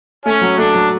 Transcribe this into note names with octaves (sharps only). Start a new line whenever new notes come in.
A3 C#4
F#3
A3 D4
F#3